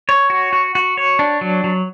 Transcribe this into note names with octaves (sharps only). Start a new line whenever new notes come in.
C#5
F#4
F#4
F#4
C#5
D4
F#3
F#3